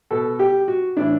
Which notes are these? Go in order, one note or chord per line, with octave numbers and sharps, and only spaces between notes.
B2 A4
G4
F#4
A2 E3 D4